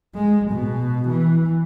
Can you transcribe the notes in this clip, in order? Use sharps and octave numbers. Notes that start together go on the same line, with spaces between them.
G#3
B2
E3